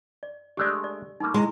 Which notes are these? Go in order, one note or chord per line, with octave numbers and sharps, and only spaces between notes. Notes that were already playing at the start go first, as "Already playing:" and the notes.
D5
G#3 A3 D4 G4 D5
D5
G3 A3 A#3 D#4
G#3 E4 C6